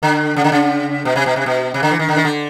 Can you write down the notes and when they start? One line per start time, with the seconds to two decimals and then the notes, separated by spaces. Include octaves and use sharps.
0.03 D3
0.36 C#3
0.44 D3
0.52 C#3
1.05 B2
1.16 C3
1.26 B2
1.36 C3
1.46 B2
1.74 C3
1.83 D3
1.91 E3
1.99 D#3
2.09 D3
2.17 D#3
2.25 D3